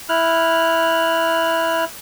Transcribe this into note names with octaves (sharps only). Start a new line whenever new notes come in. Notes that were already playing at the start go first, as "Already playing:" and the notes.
E4 F6 F#6